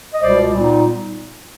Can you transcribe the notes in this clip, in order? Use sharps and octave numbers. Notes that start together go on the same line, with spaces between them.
D#5
C#2 B2 G3 C5 D5
A#2 G3 B3 D#4